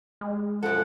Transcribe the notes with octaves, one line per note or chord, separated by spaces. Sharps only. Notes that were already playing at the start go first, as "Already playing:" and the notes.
G#3
F#2 B2 F3 A4 F#5